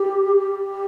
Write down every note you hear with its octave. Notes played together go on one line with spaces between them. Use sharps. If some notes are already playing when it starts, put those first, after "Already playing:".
Already playing: G4
G4